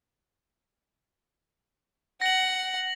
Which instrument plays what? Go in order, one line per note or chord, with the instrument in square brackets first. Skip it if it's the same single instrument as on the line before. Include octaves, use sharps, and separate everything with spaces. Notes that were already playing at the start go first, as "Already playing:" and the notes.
[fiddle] F#5 [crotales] A#6 F#7